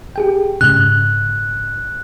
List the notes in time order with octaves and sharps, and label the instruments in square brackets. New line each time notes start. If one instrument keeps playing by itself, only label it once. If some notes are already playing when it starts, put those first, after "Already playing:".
[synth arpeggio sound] G4 G#4 G5
[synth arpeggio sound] G#2 C#3 [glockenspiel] F#6